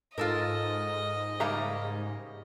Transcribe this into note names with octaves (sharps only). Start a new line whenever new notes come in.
G#2 F4 A4 A#4 D#5
C#3 G3 A#3 E5 F5 A#5